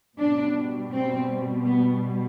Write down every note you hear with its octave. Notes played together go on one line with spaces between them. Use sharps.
B2 G3 D4
C4
B3